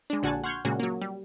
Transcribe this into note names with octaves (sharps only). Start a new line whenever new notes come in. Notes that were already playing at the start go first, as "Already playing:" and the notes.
G#3 D4
A#1 D3 F#4 F#5 G#5 A5
F#5 C6 C#6 F6 G6 G#6
A#2 C#3 G#3 A#3 F#4 G#4
F#3 A#3
G3